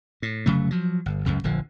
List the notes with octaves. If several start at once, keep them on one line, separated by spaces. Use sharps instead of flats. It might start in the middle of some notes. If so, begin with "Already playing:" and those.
A2
F1 C#3 F#3 A3
F3 F#3
G1
C#2 F#2 C#3
D1 A#1 D3 F3